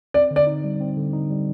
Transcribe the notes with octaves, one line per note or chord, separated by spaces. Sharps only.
C4 D5
D3
D5
D#4
G3
C4
D3
D#4
G3